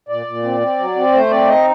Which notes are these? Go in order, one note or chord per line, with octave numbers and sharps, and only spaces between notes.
A#2 D5
A#2
C4
C4
F#3
C4
A3 C5
C4 D5
D#4 D#5